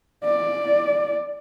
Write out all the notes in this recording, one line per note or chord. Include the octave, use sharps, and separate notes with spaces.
D5